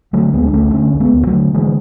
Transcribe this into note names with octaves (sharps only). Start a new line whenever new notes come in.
D3 F#3 A3
D2 G#3 B3
D4
D2 A3 C#4
D3 A3 C#4
D2
G#3 B3
D2
F#3 A3
D3
D3 E3 G#3